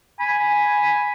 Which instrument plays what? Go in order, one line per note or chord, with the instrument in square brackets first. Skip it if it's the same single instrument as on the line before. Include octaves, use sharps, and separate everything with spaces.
[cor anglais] G#5 [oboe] B5